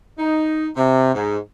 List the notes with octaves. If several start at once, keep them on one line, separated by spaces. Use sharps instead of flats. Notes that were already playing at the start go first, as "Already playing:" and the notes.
D#4
C3
G#2